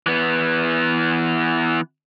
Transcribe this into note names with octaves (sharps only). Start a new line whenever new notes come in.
E3 B3